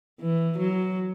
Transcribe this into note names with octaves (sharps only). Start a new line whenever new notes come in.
E3
F#3